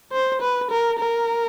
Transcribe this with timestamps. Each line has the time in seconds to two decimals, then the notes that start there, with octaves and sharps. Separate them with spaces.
0.12 C5
0.42 B4
0.71 A#4
0.99 A#4